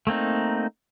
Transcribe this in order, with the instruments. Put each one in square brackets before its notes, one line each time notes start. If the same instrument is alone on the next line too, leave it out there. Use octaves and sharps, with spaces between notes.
[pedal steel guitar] A3 A#3 C4 D#4